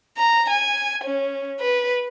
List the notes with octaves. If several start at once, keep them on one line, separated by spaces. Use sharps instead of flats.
A#5
G#5
C#4
B4